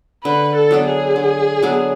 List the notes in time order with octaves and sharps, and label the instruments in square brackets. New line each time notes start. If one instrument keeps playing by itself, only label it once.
[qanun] D3 [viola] B4
[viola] A4
[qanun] F#3 B3 D4
[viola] G#4
[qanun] D3
F#3 B3 D4